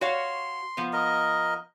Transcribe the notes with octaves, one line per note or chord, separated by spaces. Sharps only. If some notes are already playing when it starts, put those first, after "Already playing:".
F#4 C#5 F5 C6
F3 B3
A#4 D#5